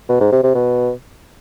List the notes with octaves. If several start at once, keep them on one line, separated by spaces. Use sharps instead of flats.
B2
G#2
C3
C3
B2